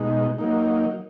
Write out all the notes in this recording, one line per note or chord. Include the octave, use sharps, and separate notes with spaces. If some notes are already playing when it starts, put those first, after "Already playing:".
Already playing: B2 G#3 D#4
F#3 A#3 D#4